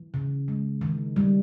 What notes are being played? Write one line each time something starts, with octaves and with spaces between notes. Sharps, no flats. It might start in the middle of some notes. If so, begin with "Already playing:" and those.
Already playing: E3
C#3
G#3
D#3
G3